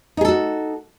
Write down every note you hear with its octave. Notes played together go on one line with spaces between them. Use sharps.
D#4 F#4 G#4 A4